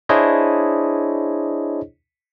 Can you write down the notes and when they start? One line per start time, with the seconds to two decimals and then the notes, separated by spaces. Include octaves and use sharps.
0.09 D4 E4 G#4 C5 C#5 D#5